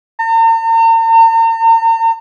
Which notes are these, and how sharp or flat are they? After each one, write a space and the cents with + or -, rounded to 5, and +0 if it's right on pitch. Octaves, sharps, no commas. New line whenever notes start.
A#5 -45